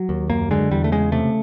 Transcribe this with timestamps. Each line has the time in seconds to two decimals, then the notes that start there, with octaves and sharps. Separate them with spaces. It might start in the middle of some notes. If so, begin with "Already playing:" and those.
Already playing: F#3
0.09 D#2
0.30 F#2 A#3
0.51 D3 G#3
0.71 E2 G3
0.84 A3
0.92 C#3 G#3
1.12 C3 A3